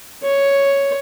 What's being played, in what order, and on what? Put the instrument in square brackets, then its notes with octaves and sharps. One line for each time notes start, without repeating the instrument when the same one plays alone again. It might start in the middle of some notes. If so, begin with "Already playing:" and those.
[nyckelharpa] C#5